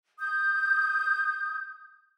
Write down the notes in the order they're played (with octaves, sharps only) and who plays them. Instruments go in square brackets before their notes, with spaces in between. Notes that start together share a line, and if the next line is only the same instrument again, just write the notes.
[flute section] D#6 G6